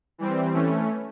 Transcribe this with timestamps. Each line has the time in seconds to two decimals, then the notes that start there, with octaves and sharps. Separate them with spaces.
0.18 E3 G3 C4
0.53 E3 A3 C#4